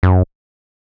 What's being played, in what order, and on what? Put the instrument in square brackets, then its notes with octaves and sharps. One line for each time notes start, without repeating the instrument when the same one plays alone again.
[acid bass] F#2